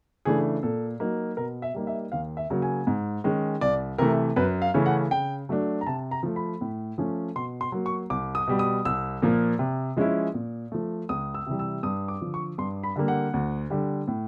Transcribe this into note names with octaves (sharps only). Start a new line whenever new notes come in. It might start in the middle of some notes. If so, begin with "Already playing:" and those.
C#3 E3 A3 D4 G#4
A#2 A4
F#3 A#3 D#4
B2 A#4
E5
G3 A#3 D#4
E5
D#2 F5
E5
C#3 F#3 A#3
G#5
G#2
D#3 G#3 C#4
C2 D5
C3 E3 A3 A#4
F#2 B4
F5
C#3 E3 A3 C#4
F#5
C#3 G5
F#3 A3 D4
A#5
C3 A5
A#5
F3 A3
B5
A2
F3 A3 C#4
B2 C6
C6
F#3 A#3
C#6
C2 D6
D#6
B2 G3
D#6
C2 E6
A#2 F3 A#3
C3
F3 G#3 C#4 E4
A#2
F3 A3
C#2 D#6
E6
C3 E3 G3
E6
G2 D#6
D6
D3 F3
C#6
G2 C6
B5
D3 G3 A#3
F#5
D2
D3 G3
A2